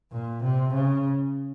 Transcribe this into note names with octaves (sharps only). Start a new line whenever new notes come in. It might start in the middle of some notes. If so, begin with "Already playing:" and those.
A#2
C3
C#3